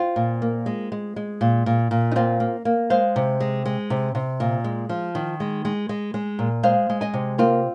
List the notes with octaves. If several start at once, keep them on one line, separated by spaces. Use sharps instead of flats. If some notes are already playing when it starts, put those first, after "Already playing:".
Already playing: C4 F4
A#2
A#3
G#3
G#3
G#3
A#2
A#2
A#2
D#4
A#3 C4 F4
A#3
A#3
G#3 C5 F5
C3
G#3
G#3
C3
C3
A#2
G#3
F3
D#3
G#3
G#3
G#3
G#3
A#2
G#3 C5 F5
G#3
D#5 G#5
C3
A#3 C4 F4